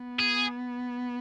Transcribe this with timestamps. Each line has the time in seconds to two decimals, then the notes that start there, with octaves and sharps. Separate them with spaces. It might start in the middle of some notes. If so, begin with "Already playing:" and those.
Already playing: B3
0.20 G#4